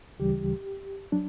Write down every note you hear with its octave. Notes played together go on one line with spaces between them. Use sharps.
D2 C#3 E3 G3 G4
F#3 D4